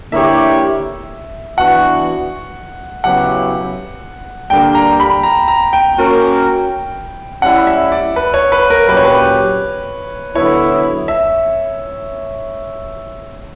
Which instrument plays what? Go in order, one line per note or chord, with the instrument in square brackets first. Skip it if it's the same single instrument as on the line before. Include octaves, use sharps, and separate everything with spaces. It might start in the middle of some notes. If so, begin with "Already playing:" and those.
[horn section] D3 A#3 E4 G4 C#5 [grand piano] E5
[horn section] E3 B3 D4 F#4 [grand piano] F#5
[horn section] C#3 F#3 B3 E4 G4 [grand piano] F#5
[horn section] D3 G3 A#3 D4 G4 [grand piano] G5
[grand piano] A#5
B5
A#5
A#5
G5
[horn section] A#3 C#4 F#4 A#4
[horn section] G3 C#4 E4 [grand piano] F#5
[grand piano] E5
D5
B4
C#5
B4
A#4
[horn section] A#2 F#3 C#4 G4 [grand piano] B4
[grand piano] C#5
B4
[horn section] D3 F#3 B3 E4 [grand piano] C#5
[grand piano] E5